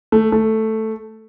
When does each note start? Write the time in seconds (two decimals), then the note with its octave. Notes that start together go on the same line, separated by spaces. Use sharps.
0.12 A3
0.32 A3